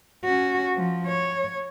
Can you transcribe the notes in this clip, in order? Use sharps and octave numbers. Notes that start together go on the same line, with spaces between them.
C#4 F#4
F3
C#5